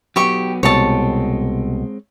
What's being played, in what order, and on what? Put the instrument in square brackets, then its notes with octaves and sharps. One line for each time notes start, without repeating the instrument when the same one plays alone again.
[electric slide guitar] F#3 B3 [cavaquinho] G4 C#6
[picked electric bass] C2 B2 [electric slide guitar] G#3 C4 [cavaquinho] C#5 A5